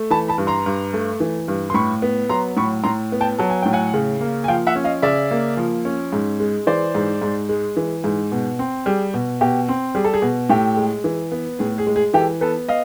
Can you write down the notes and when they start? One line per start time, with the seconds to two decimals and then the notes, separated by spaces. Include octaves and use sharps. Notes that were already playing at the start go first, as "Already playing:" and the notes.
Already playing: A3
0.11 E3 A5 B5
0.28 A5 B5
0.38 G2
0.47 A#5 C6
0.66 G2
0.93 A3
1.20 E3
1.48 G2
1.70 C6
1.74 A2 B5 C#6
2.02 B3
2.29 F#3 A#5 C6
2.57 A2 B5 C#6
2.84 A2 A#5 C6
3.12 B3
3.21 G5 A5
3.39 F#3 A5
3.50 G#5
3.62 A2 G5
3.73 F#5 G#5
3.94 C#3
4.21 A#3
4.44 G#5
4.48 F3 F5 G5
4.67 E5 F#5
4.76 C#4
4.84 D#5 F5
5.02 C#3 D5 E5
5.31 A#3
5.57 F3
5.85 C#4
6.13 G#2
6.40 G#3
6.67 E3 C5 D5
6.95 G#2
7.22 G#2
7.49 G#3
7.77 E3
8.04 G#2
8.32 B2
8.59 C4
8.86 G3 G#4
9.14 B2
9.41 B2 G4
9.69 C4
9.95 G3 G#4
10.05 A4
10.14 G#4
10.22 B2
10.49 A2 G4 A4
10.77 G#3
11.04 E3
11.32 B3
11.59 A2 G#4
11.78 G#4
11.87 G#3
11.96 G#4
12.14 E3 G4 A4
12.41 B3 A4 B4
12.69 D#5 F5